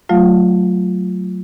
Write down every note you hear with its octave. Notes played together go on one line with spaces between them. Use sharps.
F#3 A3 F4 F5